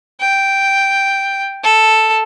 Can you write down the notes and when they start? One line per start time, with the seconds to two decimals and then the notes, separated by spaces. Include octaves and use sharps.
0.21 G5
1.64 A4